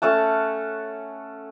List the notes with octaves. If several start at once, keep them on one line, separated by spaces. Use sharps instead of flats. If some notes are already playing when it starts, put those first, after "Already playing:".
A3 C#4 F#5 A5